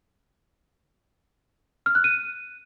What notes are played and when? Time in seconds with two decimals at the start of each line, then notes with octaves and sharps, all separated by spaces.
1.86 F6
1.95 F#6
2.04 D#7